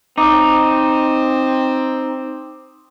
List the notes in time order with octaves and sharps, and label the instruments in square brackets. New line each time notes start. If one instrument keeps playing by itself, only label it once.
[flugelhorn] C4 [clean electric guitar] D#4 [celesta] D6 D#6